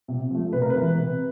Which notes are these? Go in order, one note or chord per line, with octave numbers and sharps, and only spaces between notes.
C3
F3 A3
C3 B4
A#4
B4
E3 G#3
C3